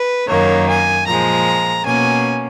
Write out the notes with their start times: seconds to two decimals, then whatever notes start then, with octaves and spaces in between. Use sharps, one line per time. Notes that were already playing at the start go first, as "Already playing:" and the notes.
Already playing: B4
0.28 F#2 D#3 A#3 C#5
0.67 G#5
1.06 A#2 F3 G#3 A#5
1.84 B2 A#3 C#4 G#5